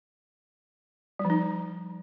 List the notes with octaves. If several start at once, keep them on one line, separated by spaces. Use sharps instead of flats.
G3
F3
D#4